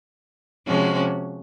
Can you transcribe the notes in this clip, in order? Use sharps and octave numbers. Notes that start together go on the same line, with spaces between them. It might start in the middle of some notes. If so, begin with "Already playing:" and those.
C3 F3 G#3 C#4 F#4